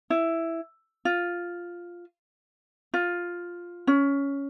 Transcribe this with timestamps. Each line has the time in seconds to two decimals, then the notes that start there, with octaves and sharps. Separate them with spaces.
0.10 E4
1.05 F4
2.94 F4
3.87 C#4